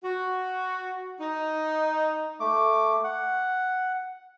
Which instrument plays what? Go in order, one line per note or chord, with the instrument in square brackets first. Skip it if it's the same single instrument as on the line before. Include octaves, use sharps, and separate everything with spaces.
[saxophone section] F#4
D#4
[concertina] A3 D6
F#5